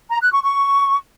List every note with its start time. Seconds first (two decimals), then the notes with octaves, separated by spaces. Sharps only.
0.09 A#5
0.21 F#6
0.32 C#6
0.43 C#6